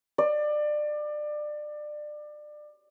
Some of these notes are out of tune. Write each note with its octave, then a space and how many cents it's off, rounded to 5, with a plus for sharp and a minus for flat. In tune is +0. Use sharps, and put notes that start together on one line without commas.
D5 +25